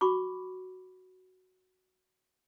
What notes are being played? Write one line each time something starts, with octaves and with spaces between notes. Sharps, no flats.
F#4 B5 C#6 D6